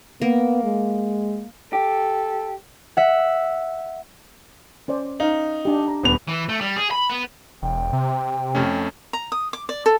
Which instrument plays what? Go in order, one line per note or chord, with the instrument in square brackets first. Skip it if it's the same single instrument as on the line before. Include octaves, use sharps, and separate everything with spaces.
[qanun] A#3 [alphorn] B3
[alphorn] G#3
[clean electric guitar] G4 [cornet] A4
[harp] E5 F#5
[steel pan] C#4 C5 D5
[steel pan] C#4 F5 [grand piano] D#4
[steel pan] D4 G4
A#5
[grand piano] D#1 B3 F7
[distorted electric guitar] E3
A3
G3
G#4
B5
B3
[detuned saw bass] E1 [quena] G5
[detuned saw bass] C3
[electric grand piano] F2 A3 C#4
[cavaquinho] A#5
D#6
D6
D5
A4